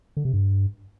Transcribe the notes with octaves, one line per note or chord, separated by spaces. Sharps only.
D3
C3
G2